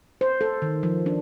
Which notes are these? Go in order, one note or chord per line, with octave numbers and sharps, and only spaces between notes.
C5
A4
D#3
F3
D4